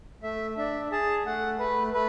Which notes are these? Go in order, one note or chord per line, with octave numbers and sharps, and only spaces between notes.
A3 E5
D4 E5
G#4 A5
A3 F#5
A3 B4
A3 B4